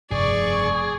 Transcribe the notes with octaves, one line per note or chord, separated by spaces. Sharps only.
F1 G2 C#3 G#4 D5 C#6